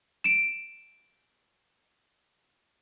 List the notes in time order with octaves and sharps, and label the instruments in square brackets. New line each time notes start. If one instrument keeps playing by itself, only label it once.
[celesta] D7 E7